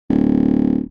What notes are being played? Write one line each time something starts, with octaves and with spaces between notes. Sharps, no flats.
D1